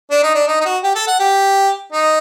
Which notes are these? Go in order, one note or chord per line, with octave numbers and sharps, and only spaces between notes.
D4
D#4
D4
D#4
D#4
F#4
G4
A4
F#5
G4
D#4